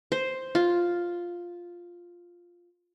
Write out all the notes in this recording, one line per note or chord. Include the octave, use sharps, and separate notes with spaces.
C5
F4